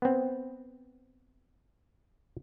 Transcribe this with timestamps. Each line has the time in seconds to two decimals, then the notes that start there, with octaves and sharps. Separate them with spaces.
0.02 B3 C4